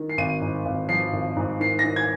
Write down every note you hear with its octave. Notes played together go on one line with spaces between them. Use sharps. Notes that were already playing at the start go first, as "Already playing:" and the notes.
Already playing: D#3
C7
G#1 D#7
G#2
G#1
F3 C7
G#1
G#2
D#3 C7
A#6
D#3
G#6